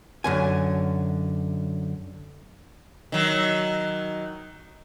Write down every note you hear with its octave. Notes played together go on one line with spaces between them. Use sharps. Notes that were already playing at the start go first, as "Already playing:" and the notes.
F#2 D3 G#5
D#3 F#3